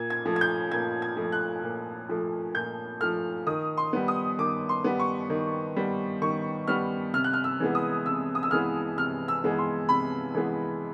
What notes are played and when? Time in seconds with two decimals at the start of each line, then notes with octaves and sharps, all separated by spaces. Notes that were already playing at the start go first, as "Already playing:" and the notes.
Already playing: A#2 G#6
0.10 G#6
0.25 F3 A3
0.36 G#6
0.41 G6
0.72 A#2 G#6
1.02 G#6
1.17 F3 A3
1.32 F#6
1.63 A#2
2.09 F3 A3
2.55 A#2 G6
3.01 F3 A3 F6
3.47 D#3 D#6
3.77 C6
3.93 G3 B3
4.08 D#6
4.39 D#3 D6
4.69 C6
4.84 G3 B3
5.00 C#6
5.30 D#3
5.76 G3 B3
6.22 D#3 C#6
6.67 G3 B3 F6
7.14 C3 F6
7.24 F#6
7.33 F6
7.44 E6
7.60 E3 G#3 B3
7.75 D#6
8.06 C3 E6
8.35 D#6
8.43 E6
8.51 E3 G#3 B3 F6
8.97 C3 F6
9.28 E6
9.44 E3 G#3 B3
9.58 C6
9.89 C3 B5
10.35 E3 G#3 B3